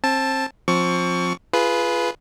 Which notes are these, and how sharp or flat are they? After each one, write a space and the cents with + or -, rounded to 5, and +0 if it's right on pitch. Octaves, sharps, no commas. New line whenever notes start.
C4 +30 A5 +0
F3 +20 C4 +20 C#6 +20
F4 -15 G#4 +20 B4 -5